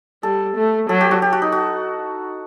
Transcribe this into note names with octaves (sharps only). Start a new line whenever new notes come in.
G3 A4
A3
F#3 A4
G4
F#4
G4
F#4
D#4
F#4